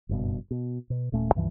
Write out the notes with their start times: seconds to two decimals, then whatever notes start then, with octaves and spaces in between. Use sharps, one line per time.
0.09 F#1 G2 B2
0.51 B2
0.90 B2
1.12 D#1 A#2 A3 C#4
1.35 C#2 G2 E3 F3